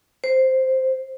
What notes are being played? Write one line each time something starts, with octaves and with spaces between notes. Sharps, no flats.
C5